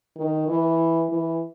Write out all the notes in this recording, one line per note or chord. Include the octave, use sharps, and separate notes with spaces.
D#3
E3
E3